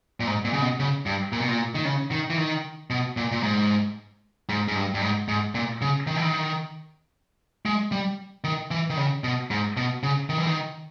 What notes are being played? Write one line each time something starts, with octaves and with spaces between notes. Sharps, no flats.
A#2
G#2
A#2
C#3
B2
C#3
G2
A#2
B2
A#2
D#3
C#3
D#3
E3
D#3
B2
A#2
A#2
G#2
G#2
G#2
G2
G2
G#2
G#2
A#2
C#3
D#3
E3
D#3
G#3
G3
D#3
E3
D#3
C#3
B2
G#2
B2
C#3
D#3
E3
D#3